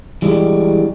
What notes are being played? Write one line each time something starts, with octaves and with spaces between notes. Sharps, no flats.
E3 G3 G#3